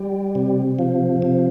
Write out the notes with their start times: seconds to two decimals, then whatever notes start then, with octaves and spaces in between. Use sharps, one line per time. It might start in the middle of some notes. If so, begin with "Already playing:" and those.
Already playing: G3
0.35 C3
0.79 F3
1.22 C3